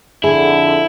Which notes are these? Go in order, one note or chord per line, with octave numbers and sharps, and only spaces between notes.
F2 D3 E4 G#4